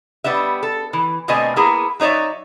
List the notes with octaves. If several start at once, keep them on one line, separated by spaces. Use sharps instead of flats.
G3 B3 D4 E5
A4
E3
B2 D3 A3 C4 D#5 G#5
A#3 B3 E4 G#4 A#4
F#3 D#4 C#5 D5 E5